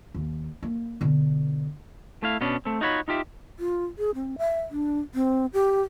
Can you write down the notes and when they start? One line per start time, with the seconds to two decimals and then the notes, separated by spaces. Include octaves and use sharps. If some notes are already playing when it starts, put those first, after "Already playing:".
0.15 D#2
0.63 A#3
1.01 B2 D3
2.23 A3 E4 F5
2.41 B2 B3 C#4 D4
2.65 A3 C4
2.81 D#4 F4 F#4 C#5 B5
3.08 D#4 F4 G4 E5
3.59 F4
3.98 G#4
4.15 C4
4.38 E5
4.71 D4
5.14 C4
5.53 G4